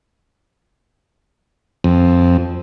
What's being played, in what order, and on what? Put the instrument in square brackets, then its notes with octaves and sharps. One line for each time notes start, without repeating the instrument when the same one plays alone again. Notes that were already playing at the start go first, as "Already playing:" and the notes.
[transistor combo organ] F2